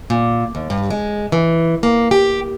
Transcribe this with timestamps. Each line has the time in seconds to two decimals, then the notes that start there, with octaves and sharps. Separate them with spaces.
0.10 A#2
0.55 D#2
0.70 G2
0.90 G#3
1.32 E3
1.83 A#3
2.11 G4